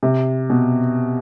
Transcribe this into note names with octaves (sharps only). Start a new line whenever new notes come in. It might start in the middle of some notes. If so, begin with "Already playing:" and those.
C3
B2